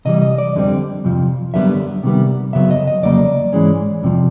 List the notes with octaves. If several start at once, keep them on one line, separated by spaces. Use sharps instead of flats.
C3 E3 G3 D#5
D#5
D5
F2 D3 G3 C4
F2 C3 F3
F#2 D3 G3 B3 E5
C3 D#3 G3 B3
F#2 C#3 F#3 B3 E5
D#5
D#5
F2 C#3 F#3 A#3 D5
G#2 E3 G#3 C#4
F2 C3 F3